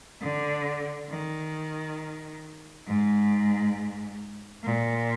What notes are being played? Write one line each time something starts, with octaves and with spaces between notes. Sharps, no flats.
D3
D#3
G#2
A#2